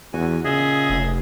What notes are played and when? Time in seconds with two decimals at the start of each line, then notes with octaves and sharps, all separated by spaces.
0.13 E2 F#4 G#5
0.45 A#2 C#3 G#4 D#5 E5
0.90 F1